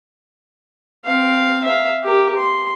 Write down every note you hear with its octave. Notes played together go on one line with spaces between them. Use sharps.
C4 F5
E5 F5
G4 A#4
C6